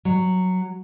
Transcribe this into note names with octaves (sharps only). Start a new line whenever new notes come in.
F#3